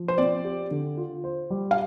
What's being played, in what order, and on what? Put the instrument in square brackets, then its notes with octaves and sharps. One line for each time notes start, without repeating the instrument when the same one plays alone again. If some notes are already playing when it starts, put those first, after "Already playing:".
Already playing: [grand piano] F3
[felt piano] C5
[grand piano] C4 [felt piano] D5
[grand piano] G4
D3
F4
C5
G3
[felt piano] F5